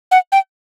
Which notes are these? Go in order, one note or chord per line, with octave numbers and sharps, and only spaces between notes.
F#5
G5